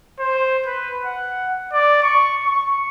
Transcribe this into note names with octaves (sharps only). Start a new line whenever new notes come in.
C5
B4
F#5
D5
C#6
C#6